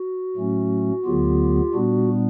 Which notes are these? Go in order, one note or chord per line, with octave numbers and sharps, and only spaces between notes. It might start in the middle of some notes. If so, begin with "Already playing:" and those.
Already playing: F#4
A2 F#3 A3 C#4
D2 D3 F#3 B3 F4 G4
A#2 G3 B3 D4 F#4